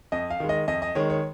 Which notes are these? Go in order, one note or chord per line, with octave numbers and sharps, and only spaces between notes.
F2 D#5
F5
D#3 G#3
D#5
F2 D#5
D#5
D#3 G#3 C#5
C#5